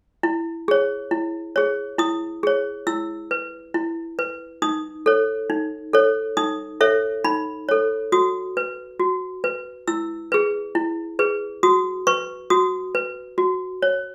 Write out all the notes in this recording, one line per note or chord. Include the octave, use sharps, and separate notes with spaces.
E4
G#4 C#5
E4
G#4 C#5
E4 D#6
G#4 C#5
E4 E6
B4
E4
B4
D#4 D#6
A4 C#5
D#4
A4 C#5
D#4 D#6
A4 C#5 E5
D#4 B5
A4 C#5
F#4 D#6
B4
F#4
B4
E4 E6
G#4 B4
E4
G#4 B4
F#4 D#6
B4 C#6
F#4 D#6
B4
F#4
C#5